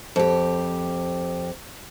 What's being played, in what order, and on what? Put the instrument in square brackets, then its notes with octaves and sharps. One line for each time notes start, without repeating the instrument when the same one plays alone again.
[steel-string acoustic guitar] F2 G4